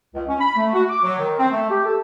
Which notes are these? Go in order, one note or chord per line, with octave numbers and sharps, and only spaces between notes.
C#2
C#4
B5
A3
F#4
D6
F#3
D#3
C4
A3
G4
A4